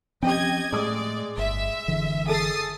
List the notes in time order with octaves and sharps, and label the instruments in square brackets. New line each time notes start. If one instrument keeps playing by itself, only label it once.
[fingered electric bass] F3 C4 C#4 [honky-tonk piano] G4 G5 [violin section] D#5 G#6
[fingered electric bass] A2 [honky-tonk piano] G#3 D#6 [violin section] D5
[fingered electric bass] G1 [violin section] E5
[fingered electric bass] F#1 D3 E3
[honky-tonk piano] G#4 A4 [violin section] D#6 A6 C7